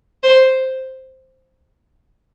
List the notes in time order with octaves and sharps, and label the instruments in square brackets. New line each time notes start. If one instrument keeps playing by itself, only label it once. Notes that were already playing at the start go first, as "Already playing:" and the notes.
[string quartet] C5